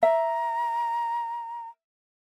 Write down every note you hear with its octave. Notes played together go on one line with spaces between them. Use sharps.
E5 A#5